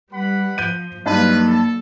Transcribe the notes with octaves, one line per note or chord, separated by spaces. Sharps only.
G3 B4 F#5 B5
F3 G6 D#7
G2 F#3 A#3 D#4 F4 B4
A4